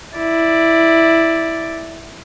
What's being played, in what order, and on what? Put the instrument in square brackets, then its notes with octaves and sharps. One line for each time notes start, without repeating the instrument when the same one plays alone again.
[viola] E4 D5